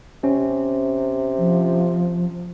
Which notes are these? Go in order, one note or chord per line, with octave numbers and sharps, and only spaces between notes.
C3 C#4
F3